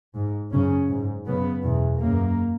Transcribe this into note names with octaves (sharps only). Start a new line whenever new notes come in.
G#2
F#2 C#3 C#4
G#2
F#2 C#3 B3
E2 B2
F#2 C#3 A#3